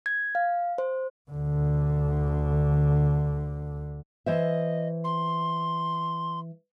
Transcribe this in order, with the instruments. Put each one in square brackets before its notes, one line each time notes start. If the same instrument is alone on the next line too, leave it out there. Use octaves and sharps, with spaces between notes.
[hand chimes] G#6
F5
C5
[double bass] D2 D3
[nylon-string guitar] E3 C5 E5 [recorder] D#5
[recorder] C6